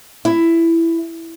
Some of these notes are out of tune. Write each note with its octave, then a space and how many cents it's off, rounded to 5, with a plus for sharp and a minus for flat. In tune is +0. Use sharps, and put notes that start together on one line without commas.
E4 +10